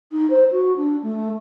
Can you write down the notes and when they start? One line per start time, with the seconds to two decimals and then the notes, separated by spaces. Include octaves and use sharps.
0.12 D#4
0.30 C5
0.51 F#4
0.76 D4
1.03 A3